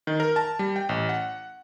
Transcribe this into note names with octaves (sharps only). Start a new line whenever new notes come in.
D#3
A#4
A5
G3
G5
A1
F#5